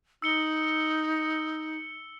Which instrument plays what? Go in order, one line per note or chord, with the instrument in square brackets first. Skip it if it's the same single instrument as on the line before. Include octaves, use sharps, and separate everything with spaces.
[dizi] D#4 [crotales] E6 C#7 G7